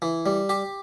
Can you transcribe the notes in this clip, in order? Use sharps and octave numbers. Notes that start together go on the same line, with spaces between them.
E3
G3
G4